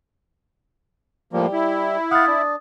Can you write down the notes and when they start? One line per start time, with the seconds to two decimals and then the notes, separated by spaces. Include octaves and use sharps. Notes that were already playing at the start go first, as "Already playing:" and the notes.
1.33 A2 F3 G3 A#3
1.53 E4
2.11 F5 F#5 D#6 A6
2.27 D4